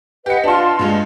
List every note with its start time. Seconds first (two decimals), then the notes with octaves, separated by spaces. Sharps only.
0.26 G4 B4 D#5 F#5 C#7
0.44 D4 F4 A5 C6
0.79 G2 G#3